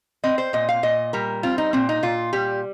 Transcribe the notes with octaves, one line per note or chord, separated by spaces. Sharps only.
C4 D#5
C5
A#2 D#5
F5
A#2 D#5
G3 A#4
C4 F4
D#4
A#2 C4
D#4
A#2 F4
G3 G4